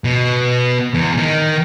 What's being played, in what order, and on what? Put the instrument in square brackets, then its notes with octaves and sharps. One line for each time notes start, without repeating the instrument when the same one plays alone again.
[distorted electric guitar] B2
E2
D#3